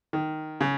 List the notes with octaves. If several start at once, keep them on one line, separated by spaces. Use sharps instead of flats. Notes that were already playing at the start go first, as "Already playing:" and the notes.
D#3
C#3